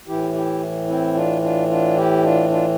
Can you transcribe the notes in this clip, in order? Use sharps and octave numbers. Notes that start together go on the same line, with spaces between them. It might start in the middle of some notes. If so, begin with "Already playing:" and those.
A2 E3 E4 G4
E4 G4
C4 E4
D4 F4
D4 F4
D4 F4
E4 G4
D4 F4
D4 F4